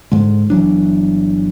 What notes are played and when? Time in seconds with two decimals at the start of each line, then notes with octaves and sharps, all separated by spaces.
0.12 G#2 D3 G#3
0.50 G1 E3 F#3 D4